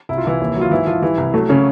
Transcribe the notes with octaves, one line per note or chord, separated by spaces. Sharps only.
C2 E4
F4
C2 E3 E4
D#2
F#3
F4
G#2 E3 E4
E3 F3 F4
E3 G3 E4
C2
F#3 A3
C#3 F#3 C#4